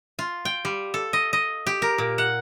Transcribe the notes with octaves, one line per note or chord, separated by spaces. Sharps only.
F4
G5
G3
A4
D#5
D#5
G4
A#4
A#2
F#5